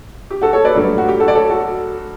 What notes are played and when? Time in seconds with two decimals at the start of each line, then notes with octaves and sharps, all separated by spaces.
0.31 G4
0.42 F#4 A4
0.53 A4 C#5
0.65 B4 D5
0.75 G2 F#3 A3
0.98 F#4
1.09 G4
1.20 F#4 A4
1.28 D5
1.35 A4 C#5
1.50 F#4 A4